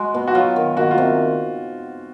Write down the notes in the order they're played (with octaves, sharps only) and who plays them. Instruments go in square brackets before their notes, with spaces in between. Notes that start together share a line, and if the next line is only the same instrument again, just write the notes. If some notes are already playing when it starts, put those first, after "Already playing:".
Already playing: [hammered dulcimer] G#3 [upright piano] F#4
[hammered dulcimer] B2
[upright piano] F#4
[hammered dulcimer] F#3 [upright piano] F4
[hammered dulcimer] D#3
[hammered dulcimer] D#3 [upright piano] F#4
[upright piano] F4
[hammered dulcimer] C3